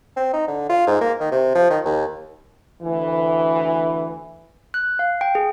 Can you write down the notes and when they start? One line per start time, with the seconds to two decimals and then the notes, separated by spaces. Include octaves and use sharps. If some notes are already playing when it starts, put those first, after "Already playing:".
0.16 C4
0.33 D#4
0.48 D3
0.69 F4
0.87 G#2
1.01 A#3
1.20 D#3
1.32 C3
1.55 F3
1.70 D#3
1.85 D#2
2.82 D2 E3
4.74 F#6
4.99 F5
5.21 G5
5.35 G#4